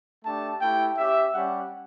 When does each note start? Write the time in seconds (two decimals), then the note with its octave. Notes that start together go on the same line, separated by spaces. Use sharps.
0.25 A3 D4 G4 A5
0.61 A3 E4 G4 G5
0.97 C#4 G4 E5
1.34 G3 C#4 G4 F#5